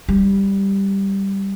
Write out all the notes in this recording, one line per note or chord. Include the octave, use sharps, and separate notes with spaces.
G3